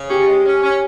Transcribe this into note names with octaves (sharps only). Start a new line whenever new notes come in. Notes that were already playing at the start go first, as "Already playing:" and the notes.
Already playing: C#3
C#4 G4
G#3
C#4
C#4